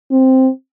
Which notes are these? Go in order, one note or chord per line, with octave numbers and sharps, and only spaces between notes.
C4